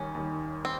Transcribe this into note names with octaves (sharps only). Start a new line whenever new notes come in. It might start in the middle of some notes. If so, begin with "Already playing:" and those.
Already playing: D#2 D#3 G3 C#4
D#2 D#3 G3
C4